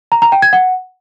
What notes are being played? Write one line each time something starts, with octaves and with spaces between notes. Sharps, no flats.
A#5
A#5
G5
G#6
F#5